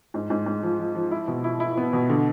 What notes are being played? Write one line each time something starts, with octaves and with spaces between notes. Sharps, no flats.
G#2
G#2
G#2
F3
F3
F3
E4
B2
E4
E4
B3
B2
D3